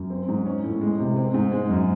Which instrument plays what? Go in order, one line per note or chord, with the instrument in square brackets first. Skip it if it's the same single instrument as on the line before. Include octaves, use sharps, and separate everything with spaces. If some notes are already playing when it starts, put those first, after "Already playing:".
Already playing: [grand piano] F#2
C4
G#2
C#4
A2
G#3
C3
C4
G#2
G#3
F#2